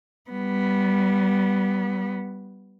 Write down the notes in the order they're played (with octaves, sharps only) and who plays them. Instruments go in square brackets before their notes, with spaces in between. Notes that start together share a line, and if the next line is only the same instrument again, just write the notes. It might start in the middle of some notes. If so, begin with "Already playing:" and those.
[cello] G3 B3